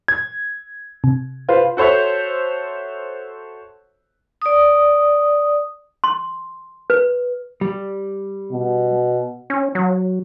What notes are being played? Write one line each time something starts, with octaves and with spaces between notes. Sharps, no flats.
G#6
C3
F4 B4 C5
F#4 A4 C5 C#5 E5
D5 D#6
C6
B4
G3
B2
C#4
F#3